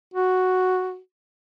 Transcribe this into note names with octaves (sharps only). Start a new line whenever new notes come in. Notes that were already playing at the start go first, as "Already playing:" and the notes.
F#4